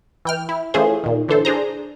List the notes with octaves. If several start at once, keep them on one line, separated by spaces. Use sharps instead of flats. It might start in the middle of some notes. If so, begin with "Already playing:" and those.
E3 G5 F6
E4
E3 A3 C#4 F4 G#4 C5
A#2 D#3
D3 E3 A4 C5
D4 G#4 C5 A#5